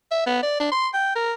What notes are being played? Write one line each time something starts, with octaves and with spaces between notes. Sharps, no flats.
E5
B3
D5
D4
C6
G5
A#4